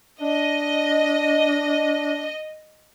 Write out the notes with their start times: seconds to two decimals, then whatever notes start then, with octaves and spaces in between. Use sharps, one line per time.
0.21 D4 D#5